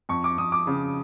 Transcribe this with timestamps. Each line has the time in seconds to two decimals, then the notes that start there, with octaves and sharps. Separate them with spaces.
0.09 F2 C#6
0.24 D6
0.38 F2 D#6
0.52 D6
0.67 C#3